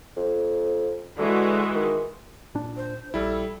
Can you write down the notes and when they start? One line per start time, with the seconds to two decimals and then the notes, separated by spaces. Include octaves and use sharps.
0.17 F2
1.18 D3 E3 G#3 F#4
1.75 D#3
2.55 A#2 D4
2.77 C5
3.14 A#1 G3 E4 A4